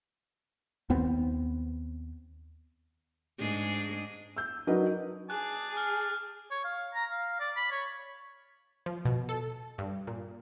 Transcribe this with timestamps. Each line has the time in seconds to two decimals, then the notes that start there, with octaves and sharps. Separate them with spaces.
0.90 D#2 B3 C4
3.40 G#2 D4 G#4
4.37 E6 G6
4.67 F#3 D4 D#4 A#4 B4 D#5
5.30 G#4 G#5 A5 D6 F#6
5.77 F6
6.51 C#5
6.64 F5
6.94 A#5
7.11 F5
7.40 D5
7.56 B5
7.71 C#5
8.86 F3
9.05 B2
9.29 A4
9.78 G2
10.07 A#2